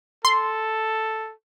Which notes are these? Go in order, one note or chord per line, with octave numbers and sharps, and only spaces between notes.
A4 C6